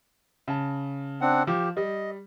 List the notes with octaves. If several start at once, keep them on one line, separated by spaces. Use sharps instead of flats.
C#3 A5
C4 D4 F#5
F3 G4
G3 D#5